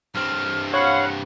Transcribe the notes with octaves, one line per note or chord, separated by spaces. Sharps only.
G2 C4 F6
C#5 F5 F#5 B5